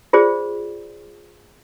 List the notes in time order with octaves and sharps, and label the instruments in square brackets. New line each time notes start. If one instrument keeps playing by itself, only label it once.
[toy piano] F4 G#4 C5 D5